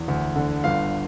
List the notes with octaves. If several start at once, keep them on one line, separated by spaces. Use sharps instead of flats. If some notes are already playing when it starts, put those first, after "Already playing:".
Already playing: E2
D2
D3
G1 F5